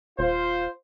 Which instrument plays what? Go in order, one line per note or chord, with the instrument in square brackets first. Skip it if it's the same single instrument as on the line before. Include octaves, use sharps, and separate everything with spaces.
[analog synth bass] D#1 [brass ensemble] F4 C5